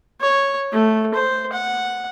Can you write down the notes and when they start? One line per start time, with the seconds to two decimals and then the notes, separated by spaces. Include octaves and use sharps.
0.21 C#5
0.73 A3
1.15 C5
1.53 F#5